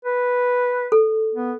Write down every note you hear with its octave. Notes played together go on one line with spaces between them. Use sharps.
B4
A4
B3